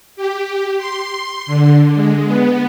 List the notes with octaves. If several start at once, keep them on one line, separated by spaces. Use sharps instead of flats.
G4
C6
D3
G#3
B3